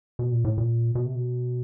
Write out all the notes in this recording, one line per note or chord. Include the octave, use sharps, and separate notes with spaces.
B2
A#2
A2
A#2
B2
C3
B2